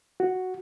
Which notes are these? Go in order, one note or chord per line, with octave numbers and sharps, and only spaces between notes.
F#4